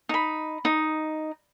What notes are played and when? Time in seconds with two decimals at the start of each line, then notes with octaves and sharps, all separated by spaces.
0.09 D#4 B5
0.65 D#4